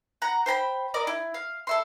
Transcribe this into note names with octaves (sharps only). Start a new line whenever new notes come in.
F#5 A#5
C5 G5 A#5 B5
A#4 D5 D#5
E4
F5
A4 E5 C6